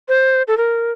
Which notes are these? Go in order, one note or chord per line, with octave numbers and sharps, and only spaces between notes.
C5
A4
A#4